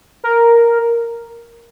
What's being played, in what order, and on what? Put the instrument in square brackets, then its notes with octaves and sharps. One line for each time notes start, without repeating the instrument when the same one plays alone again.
[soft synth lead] A#4